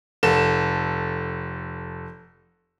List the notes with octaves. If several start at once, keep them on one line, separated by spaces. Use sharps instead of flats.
F1 A4 E7